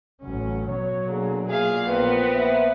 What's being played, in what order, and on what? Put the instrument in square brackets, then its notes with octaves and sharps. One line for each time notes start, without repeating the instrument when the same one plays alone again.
[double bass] A1 C#4 [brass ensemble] F#3
[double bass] B2 F#3 [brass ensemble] C#5
[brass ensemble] D3 A#3 G#4
[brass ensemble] A#2 [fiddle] G#4 F5
[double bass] A#1 [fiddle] B3 C4
[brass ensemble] A#3 E5